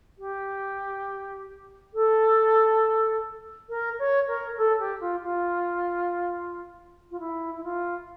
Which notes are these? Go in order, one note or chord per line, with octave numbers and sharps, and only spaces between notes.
G4
A4
A#4
C#5
A#4
A4
G4
F4
F4
F4
E4
E4
F4